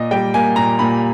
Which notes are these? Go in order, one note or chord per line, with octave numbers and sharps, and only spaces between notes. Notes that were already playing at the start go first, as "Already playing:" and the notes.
Already playing: A#2 D#5
G3 G5
A#3 G#5
A#2 A#5
A#2 B5